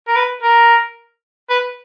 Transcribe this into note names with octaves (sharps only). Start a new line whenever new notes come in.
A#4
B4
A#4
B4